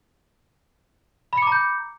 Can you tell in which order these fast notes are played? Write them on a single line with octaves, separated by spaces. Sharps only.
B5 C#7 D6 A#5 G6